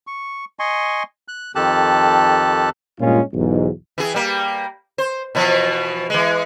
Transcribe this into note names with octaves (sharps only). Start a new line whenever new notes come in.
C#6
D#5 G#5 C6 C#6
F#6
F2 D#3 G4 A4 A5 F#6
G2 A#2 G#3 C#4 F4
B1 E2 G#2
E3 G#4
G3 A#3
C5
B2 E3 F3
E3 G#3